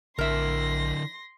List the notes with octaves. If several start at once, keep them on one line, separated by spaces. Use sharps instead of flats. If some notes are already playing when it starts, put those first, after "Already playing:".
A#1 D3 E4 A#4 E5 C6 A#6